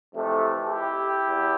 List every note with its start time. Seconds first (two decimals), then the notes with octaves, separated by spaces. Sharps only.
0.14 F2 C3 E3 A3
0.70 E4 G4
1.27 E2